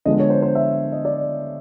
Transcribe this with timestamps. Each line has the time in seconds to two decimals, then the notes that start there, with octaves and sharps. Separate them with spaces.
0.05 D3 F3 G#3 B3 D#5
0.20 C#5
0.30 C5
0.42 C5
0.55 E5
0.92 D#5
1.05 D5